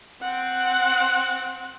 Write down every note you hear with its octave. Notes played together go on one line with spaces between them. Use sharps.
C4 F#5